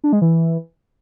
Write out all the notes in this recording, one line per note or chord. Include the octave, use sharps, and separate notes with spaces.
D4
G#3
E3